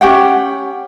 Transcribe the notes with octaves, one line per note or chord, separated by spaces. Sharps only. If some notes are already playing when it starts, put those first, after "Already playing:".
C#4 G4 F#5 G5